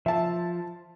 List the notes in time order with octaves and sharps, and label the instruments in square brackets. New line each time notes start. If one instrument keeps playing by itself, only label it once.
[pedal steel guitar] F3 [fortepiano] E5 A5